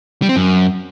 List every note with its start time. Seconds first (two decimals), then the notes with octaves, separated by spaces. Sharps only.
0.22 G3
0.29 C4
0.36 F#2